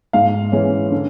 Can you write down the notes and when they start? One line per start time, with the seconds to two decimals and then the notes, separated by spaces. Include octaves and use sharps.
0.13 G#2 F5
0.52 E3 G#3 C#4
0.92 D3